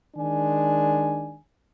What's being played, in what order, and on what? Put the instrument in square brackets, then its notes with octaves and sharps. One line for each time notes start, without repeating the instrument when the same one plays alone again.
[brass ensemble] D#3 G#3 D4 G#5